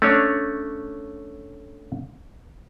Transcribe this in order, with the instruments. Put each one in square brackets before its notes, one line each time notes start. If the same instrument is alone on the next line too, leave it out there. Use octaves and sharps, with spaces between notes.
[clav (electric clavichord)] A3 C#4 D4 C#5